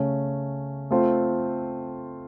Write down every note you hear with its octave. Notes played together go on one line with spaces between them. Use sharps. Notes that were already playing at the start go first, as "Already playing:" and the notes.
Already playing: C#3 A3 C#4
A3 C4 F4 A4 C5